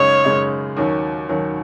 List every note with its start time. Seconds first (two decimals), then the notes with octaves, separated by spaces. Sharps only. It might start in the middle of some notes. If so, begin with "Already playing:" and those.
Already playing: F#2 C#3 G#3 D#4 C#5
0.24 F#2 C#3 G#3 D#4
0.77 D#2 D#3 F#3 C#4
1.28 D#2 D#3 F#3 C#4